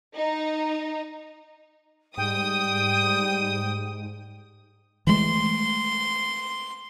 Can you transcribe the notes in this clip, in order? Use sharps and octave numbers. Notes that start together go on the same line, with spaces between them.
D#4
G#2 G3 G5 D#6
E3 G#3 A3 C6